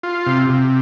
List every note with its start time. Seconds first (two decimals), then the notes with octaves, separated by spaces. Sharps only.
0.03 F4
0.27 C3
0.50 C3